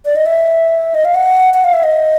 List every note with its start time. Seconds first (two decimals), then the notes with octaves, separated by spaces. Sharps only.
0.05 D5
0.16 D#5
0.26 E5
0.94 D#5
1.05 F5
1.14 F#5
1.54 F#5
1.64 F5
1.73 E5
1.83 D#5